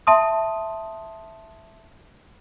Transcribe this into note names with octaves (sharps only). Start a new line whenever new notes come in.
E5 A5 C6 D#6